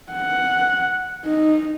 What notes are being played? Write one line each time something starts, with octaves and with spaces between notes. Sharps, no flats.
F#5
D#4